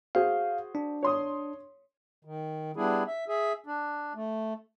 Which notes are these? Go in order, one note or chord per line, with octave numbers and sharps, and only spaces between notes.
F#4 G#4 C5 F5
D4
C#5 C6 D#6
D#3
G3 B3 D4 E4 G#4
E5
G#4 E5
D4
A3